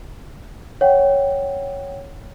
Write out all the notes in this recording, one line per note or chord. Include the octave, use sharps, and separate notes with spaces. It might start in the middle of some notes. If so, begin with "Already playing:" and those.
C#5 F#5 G5